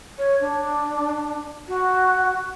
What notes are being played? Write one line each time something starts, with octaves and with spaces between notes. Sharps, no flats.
C#5
D4
F#4